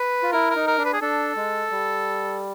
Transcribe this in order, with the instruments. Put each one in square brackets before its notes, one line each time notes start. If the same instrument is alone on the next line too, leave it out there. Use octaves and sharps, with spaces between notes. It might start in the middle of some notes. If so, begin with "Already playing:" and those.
Already playing: [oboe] B4
[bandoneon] F4
[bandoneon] E4 [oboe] A#4
[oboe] A#4
[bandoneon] D#4
[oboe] A#4
[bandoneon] D4
[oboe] B4
G#4
[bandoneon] D4 [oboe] A4
[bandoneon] G#3
G3